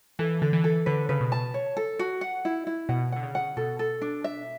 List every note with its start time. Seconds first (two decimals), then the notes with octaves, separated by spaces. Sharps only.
0.19 E3 A4
0.42 D3 A4
0.53 E3
0.64 A4
0.86 D3 B4
1.09 C#3 B4
1.20 B2
1.32 A5
1.54 C#5
1.77 A4
1.99 F#4
2.21 F#5
2.45 E4
2.67 E4
2.89 B2 F#5
3.12 D3 F#5
3.23 C#3
3.35 F#5
3.57 B2 A4
3.79 A4
4.02 D4
4.24 E5